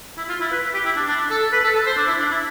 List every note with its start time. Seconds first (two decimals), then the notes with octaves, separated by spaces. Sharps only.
0.18 E4
0.29 F4
0.41 E4
0.52 B4
0.74 G4
0.85 E4
0.97 D4
1.08 D4
1.30 A4
1.53 B4
1.63 A4
1.75 A4
1.86 C5
1.97 D4
2.07 E4
2.19 D4
2.31 E4